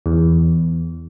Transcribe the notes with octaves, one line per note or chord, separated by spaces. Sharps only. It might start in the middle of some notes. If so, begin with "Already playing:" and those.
E2